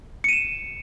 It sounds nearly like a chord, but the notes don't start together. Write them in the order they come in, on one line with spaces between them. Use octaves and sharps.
C#7 D#7 E7